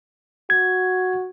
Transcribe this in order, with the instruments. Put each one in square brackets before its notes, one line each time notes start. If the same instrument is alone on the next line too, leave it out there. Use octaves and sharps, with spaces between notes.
[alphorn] F#4 [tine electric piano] G#6